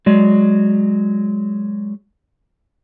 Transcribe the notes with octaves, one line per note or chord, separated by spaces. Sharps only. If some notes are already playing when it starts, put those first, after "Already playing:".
F#3 G#3 D5